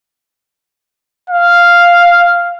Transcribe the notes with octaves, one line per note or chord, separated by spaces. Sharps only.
F5